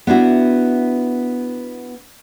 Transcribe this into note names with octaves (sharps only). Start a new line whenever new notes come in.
B3 D4 E4 F#4